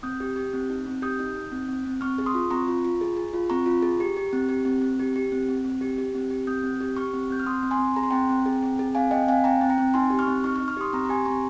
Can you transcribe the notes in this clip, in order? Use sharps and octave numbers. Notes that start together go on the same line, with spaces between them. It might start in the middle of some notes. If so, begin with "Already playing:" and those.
C4 D#6 G6
G4
G4
C4
D#4
C4
G4 D#6 G6
D#4
D#4
C4
C4
C4
C4 C#6 F6
G#4
C6 D#6
F4
C4 A#5 C#6
F4
F4
G#4
G#4
F4
C4 A#5 C#6
F4
G#4
G4
G4
C4
G4
C4
C4
G4
G4
C4
C4
C4
G4
G4
C4
G4
C4 D#6 G6
C4
G4
G4 C#6 F6
C4
C4 G6
F6
C4 C6 D#6
C4
G#5 C6
C4
G#4 A#5
C6
C4 G5 A#5
C4
G#4
C4
G#4
C4 F5 G#5
C4 D#5 G5
C4 F5 G#5
C4 G5 A#5
C4
G5 A#5
C4
D#4 G#5 C6
G4
C#6 F6
C4
D#4 C#6 F6
C#6 F6
D#4
C#6 F6
G4 C6 D#6
C4 A#5 C#6
A#5
G4 G#5 C6
C4 A#5 C#6